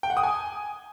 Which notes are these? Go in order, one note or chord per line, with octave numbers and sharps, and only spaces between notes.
G5
F#5
D#6
G#5